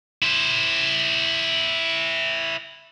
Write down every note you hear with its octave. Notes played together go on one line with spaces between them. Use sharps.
E4 C5